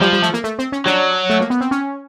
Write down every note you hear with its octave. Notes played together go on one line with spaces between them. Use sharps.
F3 G3
G3
A3
A#3
A3
C4
C#4
F#3 D4
A3
A#3
B3
C4
C#4